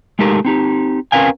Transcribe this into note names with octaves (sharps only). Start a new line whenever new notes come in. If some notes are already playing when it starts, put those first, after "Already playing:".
G#3 A3 D#4 G4 A4 A#4
C4 D#4 G4
C4 C#4 A#4 B4 F5 G#5